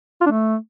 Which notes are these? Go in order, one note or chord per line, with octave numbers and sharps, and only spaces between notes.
F4
D4
A3